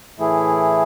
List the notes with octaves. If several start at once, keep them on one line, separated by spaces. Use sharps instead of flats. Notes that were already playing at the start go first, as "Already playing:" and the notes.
A2 E3 A3 E4 G#4